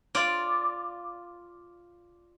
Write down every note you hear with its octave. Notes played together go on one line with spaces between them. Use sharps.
F4 D5